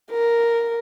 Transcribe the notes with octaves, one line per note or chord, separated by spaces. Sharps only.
A#4